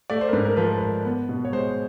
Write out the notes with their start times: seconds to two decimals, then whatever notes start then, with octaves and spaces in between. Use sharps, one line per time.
0.10 A3 D5
0.21 C5
0.29 A#4
0.33 G#2 B4
0.45 A#4
0.57 F3 B4
0.67 A#4
0.77 G#1 B4
1.05 B3
1.29 B2
1.45 C#5
1.53 G#3 C5